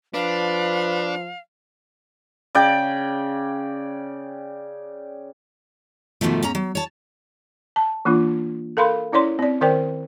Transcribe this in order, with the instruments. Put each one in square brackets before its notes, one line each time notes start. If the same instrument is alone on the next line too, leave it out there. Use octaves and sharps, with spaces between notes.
[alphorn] F3 [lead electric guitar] D4 [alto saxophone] B4 [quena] F5
[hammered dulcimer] C#3 D5 G5
[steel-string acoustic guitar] G#2 B2 D#3 F3 A3
G#2 C#4 A#5
F#3
C#5 A5
[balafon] A5
E3 A#3 D4 F4
A4 A#4 F5 B5 C6
C#4 E4 C#5 D5 C6
C4 D5
D#3 A#4 C5 D5 G5